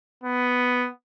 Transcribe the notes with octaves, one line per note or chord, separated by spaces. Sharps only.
B3